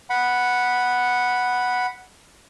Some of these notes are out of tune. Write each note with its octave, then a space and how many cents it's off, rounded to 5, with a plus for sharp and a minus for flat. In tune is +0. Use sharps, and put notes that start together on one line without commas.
F#5 +0 B5 -5